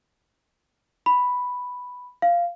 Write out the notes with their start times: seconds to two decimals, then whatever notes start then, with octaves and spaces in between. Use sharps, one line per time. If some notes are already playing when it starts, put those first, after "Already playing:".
1.06 B5
2.22 F5